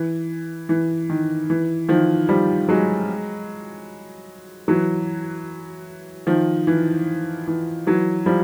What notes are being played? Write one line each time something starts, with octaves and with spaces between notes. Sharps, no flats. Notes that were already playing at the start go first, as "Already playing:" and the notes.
Already playing: E3
E3
D#3
E3
D#3 F3
F3 G3
F#3 G#3
E3 F#3
D#3 F3
E3
E3
E3 F#3
F3 G3